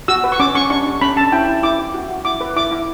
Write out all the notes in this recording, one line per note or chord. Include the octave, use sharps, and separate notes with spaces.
F#4 E6
B4
C#6
C#4 D6
C#4 C#6
D4 C#6
D4
C#4 B5
C#4 A5
E4 G5
E4
E4 D6
E4
F#4
F#4
E4 D6
B4
E4 D6
E4